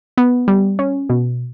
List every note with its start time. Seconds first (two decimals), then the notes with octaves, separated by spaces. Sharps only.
0.18 B3
0.48 G3
0.79 C#4
1.09 B2